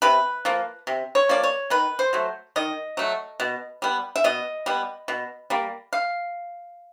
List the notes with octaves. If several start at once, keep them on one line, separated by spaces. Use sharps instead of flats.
C3 B4
F3 A#3
C3
C#5
F3 A#3 D5
C#5
D#3 B4
C5
F#3 A3
D#3 D#5
F#3 A3
B2
G3 B3
E5
B2 D#5
G3 B3
B2
G3 A#3
F5